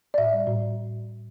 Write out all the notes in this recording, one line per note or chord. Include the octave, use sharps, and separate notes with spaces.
D5
A2 E5
G3
A2